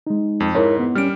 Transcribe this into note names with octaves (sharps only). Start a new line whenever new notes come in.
G#3 D#4
F2
G#2 E4 A#4 C#5
B3
G3 C#4 F6 D7